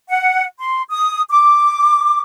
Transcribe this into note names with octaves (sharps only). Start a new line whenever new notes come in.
F#5
C6
D#6
D6